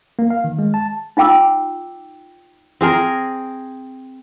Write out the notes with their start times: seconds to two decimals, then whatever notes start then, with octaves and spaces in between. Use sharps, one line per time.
0.19 A#3
0.30 F5
0.44 D#3
0.59 G#3
0.74 A5
1.17 D#4 F4 G5 D6 E6
2.81 C4 G#4 A#4